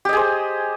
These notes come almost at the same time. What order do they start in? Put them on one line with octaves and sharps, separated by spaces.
G4 D#5 G#4 C5